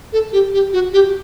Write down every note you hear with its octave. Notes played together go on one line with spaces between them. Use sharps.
A4
G4
G4
F#4
G4